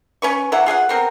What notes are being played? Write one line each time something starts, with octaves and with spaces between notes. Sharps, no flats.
C#4 B4 C#6
C3 E3 E4 F#5
F4 G#4 F5 F#5
B3 C4 A#4